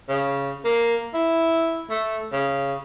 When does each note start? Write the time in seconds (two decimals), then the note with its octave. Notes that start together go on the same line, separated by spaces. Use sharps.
0.09 C#3
0.65 A#3
1.14 E4
1.90 A3
2.32 C#3